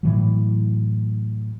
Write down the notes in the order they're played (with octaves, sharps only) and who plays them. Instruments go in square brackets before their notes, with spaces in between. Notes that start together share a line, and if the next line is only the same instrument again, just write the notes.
[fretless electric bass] A2 E3 F#3